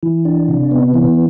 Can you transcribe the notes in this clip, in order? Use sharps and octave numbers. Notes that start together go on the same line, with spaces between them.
E3
D4
C3
B3
E3